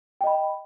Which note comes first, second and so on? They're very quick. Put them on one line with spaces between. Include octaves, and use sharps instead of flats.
G5 D#5 B5